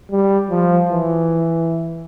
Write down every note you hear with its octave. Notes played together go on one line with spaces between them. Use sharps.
G3
F3
E3